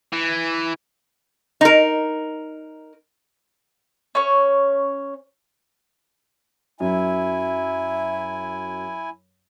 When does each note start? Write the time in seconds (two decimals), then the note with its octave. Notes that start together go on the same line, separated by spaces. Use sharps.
0.13 E3
1.61 D#4 A#4
4.15 C#4 C#5
6.80 F#2 E4 E5 G#5